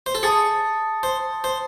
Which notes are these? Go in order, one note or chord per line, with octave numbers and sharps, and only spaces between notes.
C5
A4
G#4 A5 D#6 A6 C#7
C5
C5